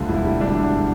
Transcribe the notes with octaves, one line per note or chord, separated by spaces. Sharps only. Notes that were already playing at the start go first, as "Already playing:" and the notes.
Already playing: D2 D3 G3 F4
E1 E4
G3
D2 D4
D3